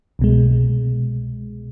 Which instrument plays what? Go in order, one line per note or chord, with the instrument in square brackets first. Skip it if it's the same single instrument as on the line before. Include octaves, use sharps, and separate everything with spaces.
[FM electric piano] C2 B2 G#3